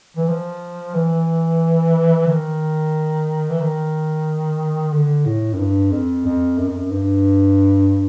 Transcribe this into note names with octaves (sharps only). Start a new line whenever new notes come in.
E3
F3
E3
D#3
E3
D#3
D3
A2
F#2
G2
F2
F2
F#2
F2
F#2
G2